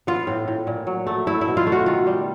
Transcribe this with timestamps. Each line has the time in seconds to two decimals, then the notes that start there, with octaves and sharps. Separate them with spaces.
0.07 B3 F4
0.27 A2
0.48 A2
0.67 A#2
0.87 F#3
1.07 A3
1.27 A3 E4
1.41 E4
1.48 B2
1.57 F4
1.67 A3
1.72 F#4
1.86 D#3 F4
2.07 G3